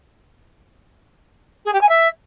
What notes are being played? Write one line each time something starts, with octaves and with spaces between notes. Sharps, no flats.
G#4
G4
G#5
E5